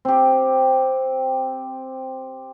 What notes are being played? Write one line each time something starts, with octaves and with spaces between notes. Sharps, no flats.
C4 G4